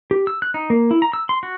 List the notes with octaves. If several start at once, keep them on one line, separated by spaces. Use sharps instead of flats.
G4
E6
F#6
D#4
A#3
E4
A#5
E6
C6
F#4